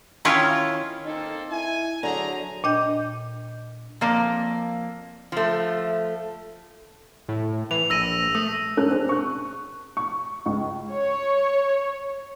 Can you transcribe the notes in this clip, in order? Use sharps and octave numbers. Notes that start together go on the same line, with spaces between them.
D#3 C#4 E4 F4 C#5
A#3 C4 D#4 A4
E4 G#5
D3 F#3 A3 G#4 A#5
A#2 D4 D#5 G5 G6
F2 A#3 D5
F3 A3
A2
E3 F7
A#1 E6 A#6 D#7
A3 D#6
G#2 C#4 A4 A#4 E6 F#6
C4 D4 G#4
C#6 F#6
C#6
C#2 C#6
C#5